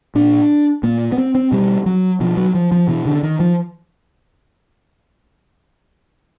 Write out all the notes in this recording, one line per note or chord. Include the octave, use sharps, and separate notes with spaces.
A#2 D4
A#2 A#3
B3
C4
C4
B2 G3
F#3
B2 F3
F#3
F3
F3
B2 E3
D3
D#3
F3